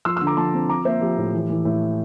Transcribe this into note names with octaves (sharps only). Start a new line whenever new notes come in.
F3 C6 E6
D3 C6 E6
A#5 D6
F3 A5 C6
C4
F3 A#5 D6
A#3 C5 E5
F3 G4
A2
E3
E3
A2